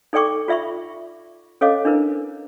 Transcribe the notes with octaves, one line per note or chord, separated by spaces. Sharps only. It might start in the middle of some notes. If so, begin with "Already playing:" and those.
D#4 A4 D5 G5 C#6 D6
F4 D5 E5 B5 C#6
C#4 A4 C#5 D#5 F5 D6
D4 E4 A#4 B4